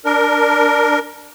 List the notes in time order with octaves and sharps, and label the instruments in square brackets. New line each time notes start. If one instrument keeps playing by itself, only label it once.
[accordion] D4 A#4